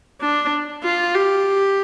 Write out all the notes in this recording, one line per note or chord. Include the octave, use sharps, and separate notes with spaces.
D4
F4
G4